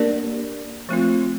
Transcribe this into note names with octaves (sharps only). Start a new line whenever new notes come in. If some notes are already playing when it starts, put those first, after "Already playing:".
Already playing: A#3 D4 G4 A#4 D5
F3 A3 C4 F4